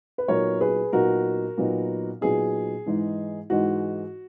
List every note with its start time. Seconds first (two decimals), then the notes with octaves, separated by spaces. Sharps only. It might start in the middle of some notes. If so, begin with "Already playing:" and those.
0.18 B4
0.28 A#2 F#3 B3 D#4 A#4 C#5
0.61 G#4 B4
0.92 A#2 F#3 B3 D#4 F#4 A#4
1.58 A#2 F#3 B3 D#4
2.21 A#2 F#3 B3 D#4 G#4
2.86 G#2 E3 G#3 D#4
3.50 G#2 E3 G#3 D#4 F#4